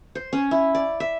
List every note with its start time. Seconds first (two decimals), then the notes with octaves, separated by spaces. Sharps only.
0.15 C5
0.33 C#4
0.51 E4
0.75 D5
1.00 E5